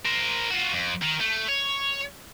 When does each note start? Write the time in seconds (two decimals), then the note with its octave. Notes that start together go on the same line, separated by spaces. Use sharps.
0.05 A#4 C5
0.50 F4 F#4
0.73 F2
1.02 D#3
1.21 A3
1.48 C#5